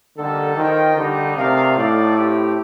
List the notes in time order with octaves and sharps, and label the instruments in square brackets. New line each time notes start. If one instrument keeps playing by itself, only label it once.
[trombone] D3 [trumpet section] G3 A#3 D#4 A4
[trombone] D#3 [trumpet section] F4 C5 D#5 G5
[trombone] D3 [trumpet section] G3 A#3 D#4 G4
[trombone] C3 [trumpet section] A3 D#4 A#4 D5 F5
[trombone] A2 [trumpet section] D#4 A4 D5 F5
[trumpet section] A3 C4 G4